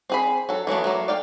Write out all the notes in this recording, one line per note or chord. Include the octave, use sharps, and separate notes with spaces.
C4 G#4 B5
F#3 A4
E3 F#3 A3 B3
F#3 A3 A#3
D5 F5 G5